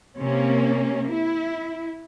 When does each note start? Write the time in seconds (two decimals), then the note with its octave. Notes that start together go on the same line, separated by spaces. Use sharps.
0.20 C3 A#3 C#4
1.10 E4